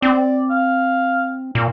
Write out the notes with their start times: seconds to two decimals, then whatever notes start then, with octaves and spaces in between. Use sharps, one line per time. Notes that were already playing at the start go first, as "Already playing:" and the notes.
0.02 C4 D5
0.50 F5
1.55 A#2